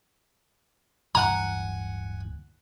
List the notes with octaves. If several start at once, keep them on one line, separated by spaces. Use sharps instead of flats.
D1 G2 E3 F#5 G#5 A#5